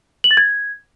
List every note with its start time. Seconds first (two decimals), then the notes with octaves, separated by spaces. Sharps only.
0.24 F#7
0.31 A6
0.37 G#6